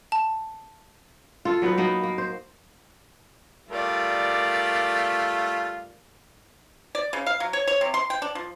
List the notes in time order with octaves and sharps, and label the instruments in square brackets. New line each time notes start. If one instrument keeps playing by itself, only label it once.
[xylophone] A5
[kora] F4 A4
F#3 B3 D#4 B4
A#3 B3 D#4 F#4
A#3
C5
[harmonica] G3 A3 F4 [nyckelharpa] A#4 D5
[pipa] D5
C#3
F5
F#3
C#5
C#5
C3
C6
G5
D4
F3